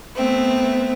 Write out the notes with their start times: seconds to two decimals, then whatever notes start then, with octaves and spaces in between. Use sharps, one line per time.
0.15 A3 B3 C4 E5